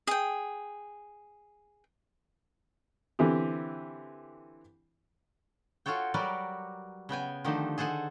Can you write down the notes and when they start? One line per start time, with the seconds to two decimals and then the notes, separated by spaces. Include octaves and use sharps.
0.07 G#4 G5
3.19 D3 E3 C4 G4
5.86 F4 F#4 A4 C#5 G5
6.14 F#3 G3 F#4 A#4 B4 D5
7.09 C#3 B3 G5 G#5
7.45 D3 D#3 F3 A3 D#4 G4
7.78 G#4 A4 C5 F#5 G#5